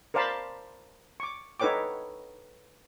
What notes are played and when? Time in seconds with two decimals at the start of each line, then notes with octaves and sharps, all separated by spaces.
0.14 A#4 C5 D5 F5 A5 B5
1.20 C#6 D6
1.60 D#4 A4 B4 C#5 G5 D6